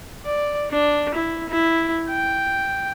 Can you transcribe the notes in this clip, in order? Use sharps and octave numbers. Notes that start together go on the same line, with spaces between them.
D5
D4
E4
E4
G5